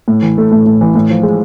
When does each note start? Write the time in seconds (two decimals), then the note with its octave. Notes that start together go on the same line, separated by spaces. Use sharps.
0.08 A2
0.22 E3
0.38 A3
0.52 A2
0.66 A2
0.81 E3
0.95 A2
1.10 F3
1.23 G#3